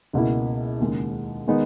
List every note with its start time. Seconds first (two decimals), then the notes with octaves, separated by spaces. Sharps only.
0.13 C#2 B2 A#3 E4
0.80 D#2 C#3 G#3
1.47 D#3 G#3 B3 D#4